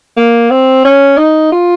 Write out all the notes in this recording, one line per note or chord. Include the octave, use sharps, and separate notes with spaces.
A#3
C4
C#4
D#4
F4